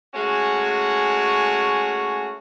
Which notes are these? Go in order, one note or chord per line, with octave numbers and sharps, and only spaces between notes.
G#3 A3 C#4 F#4